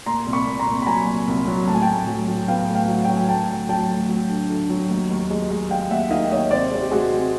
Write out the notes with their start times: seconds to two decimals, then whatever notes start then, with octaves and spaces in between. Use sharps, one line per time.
0.06 A#2 A#5 C6
0.26 C2
0.33 B5 C#6
0.47 A#2
0.59 A#5 C6
0.66 C2
0.82 B5
0.86 F#3 G#5 A#5
1.07 A#2
1.27 C2
1.47 F#3
1.68 A2 A5
1.75 G#5
1.82 G5 A5
1.88 A2
2.08 F#3
2.28 F#3
2.48 B3 F5 G5
2.69 A2
2.75 F5 G5
2.88 F#3 F#5
3.05 F#3 G5
3.16 G#5
3.29 D2 G5 A5
3.49 D2
3.69 F#3 G5 A5
3.89 D2
4.09 F#3
4.30 D3
4.50 D3
4.70 F#3
4.90 D#2
5.10 D#2
5.30 G#3
5.51 G#3
5.70 D#2 F5 G5
5.91 D#2 E5 F#5
6.01 F#5
6.10 D#3 D#5 F5
6.31 D#2 C#5 D#5
6.51 C3 C5 D5
6.71 G#3
6.80 G4
6.91 G#3 F#4 G#4
7.12 C3